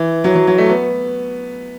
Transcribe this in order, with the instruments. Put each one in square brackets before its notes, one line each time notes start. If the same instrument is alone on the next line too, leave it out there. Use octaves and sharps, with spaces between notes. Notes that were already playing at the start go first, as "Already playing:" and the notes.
Already playing: [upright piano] E3
F#3
F#3
F#3
A3
B3